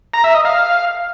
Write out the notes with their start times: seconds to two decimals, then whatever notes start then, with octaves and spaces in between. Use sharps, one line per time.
0.14 A#5
0.24 E5
0.34 D#5
0.45 F5